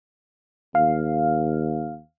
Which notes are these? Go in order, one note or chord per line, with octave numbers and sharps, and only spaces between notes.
D#2 F5